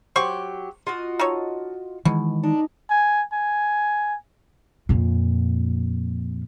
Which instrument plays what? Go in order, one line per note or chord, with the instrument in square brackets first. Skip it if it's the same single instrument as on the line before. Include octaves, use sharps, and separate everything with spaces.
[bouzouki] F#3 G4 [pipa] C5 C#6
[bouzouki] F4 F#4 D#5
[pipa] D#4 A4 C#5
[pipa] B2 [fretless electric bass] D#3 E3 G#3
[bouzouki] D4 [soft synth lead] D#4
[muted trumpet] G#5
G#5
[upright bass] F2 A#2